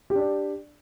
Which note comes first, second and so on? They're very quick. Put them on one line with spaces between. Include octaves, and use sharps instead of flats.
G4 D4 D5